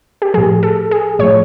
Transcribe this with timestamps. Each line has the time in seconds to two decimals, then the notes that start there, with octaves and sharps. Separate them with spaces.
0.22 G4
0.34 A2 F3 G#4
0.63 A4
0.91 G#4
1.19 A2 F3 C#5